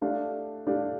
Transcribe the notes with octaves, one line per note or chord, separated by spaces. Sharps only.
A3 D4 G4 D5 F5
A3 D4 G4 D5 F5